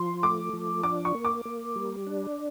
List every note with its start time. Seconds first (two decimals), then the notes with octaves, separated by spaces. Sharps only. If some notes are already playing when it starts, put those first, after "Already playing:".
Already playing: F3 C6
0.23 A3 D6
0.53 F3
0.83 D4 D6
1.05 C#6
1.15 A#3
1.25 D6
1.45 A#3
1.76 G3
2.07 D4